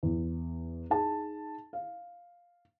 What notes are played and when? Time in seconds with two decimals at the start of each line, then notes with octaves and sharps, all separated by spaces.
0.03 E2
0.90 D#4 G#4 A5
1.73 F5